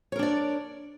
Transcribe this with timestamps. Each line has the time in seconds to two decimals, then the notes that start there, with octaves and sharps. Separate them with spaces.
0.12 C#5
0.16 A#4
0.19 D4
0.23 D5